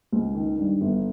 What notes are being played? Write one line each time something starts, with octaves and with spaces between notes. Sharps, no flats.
C#2
D#3
G2
G1